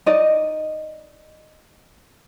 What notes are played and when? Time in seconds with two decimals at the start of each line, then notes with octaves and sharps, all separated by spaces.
0.06 D#4 D5 D#5